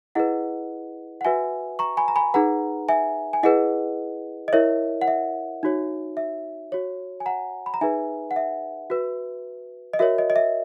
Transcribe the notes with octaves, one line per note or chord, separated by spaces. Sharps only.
E4 G#4 B4 D#5 F#5
F#5
F#4 B4 E5 G#5
A#5 C#6
G#5 B5
A#5
G#5 B5
D#4 G#4 B4 F#5 A#5
E5 G#5
G#5
E4 G#4 B4 D#5 F#5
D#5
E4 A#4 C#5 E5
F#5
E5
D#4 F#4 C#5
E5
F#4 C#5
G#5
F#5 A#5
B5
A#5
D#4 G#4 B4 E5 G#5
F#5
E5
F#4 B4
D#5
F#4 A#4 C#5 E5
D#5
D#5
E5